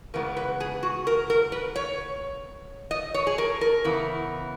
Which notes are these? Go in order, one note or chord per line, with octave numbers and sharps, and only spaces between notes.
C#3 E3 G#3 B3 A#4
B4
G#4
F#4
A#4
A#4
B4
C#5
D#5
C#5
G#4
A#4
A#4
C#3 E3 B3